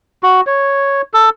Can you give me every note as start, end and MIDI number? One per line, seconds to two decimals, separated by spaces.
0.23 0.41 66
0.47 1.02 73
1.14 1.30 69